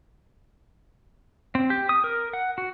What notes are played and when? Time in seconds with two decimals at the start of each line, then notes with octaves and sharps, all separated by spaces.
1.55 C4
1.70 G4
1.89 D#6
2.04 A#4
2.33 F#5
2.58 F#4